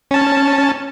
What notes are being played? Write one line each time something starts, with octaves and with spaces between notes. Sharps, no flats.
C#4 A5